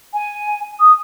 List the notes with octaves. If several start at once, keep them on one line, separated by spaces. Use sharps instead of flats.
G#5
D#6